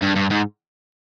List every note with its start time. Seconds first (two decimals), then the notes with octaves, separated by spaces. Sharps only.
0.02 G2
0.16 G2
0.31 G#2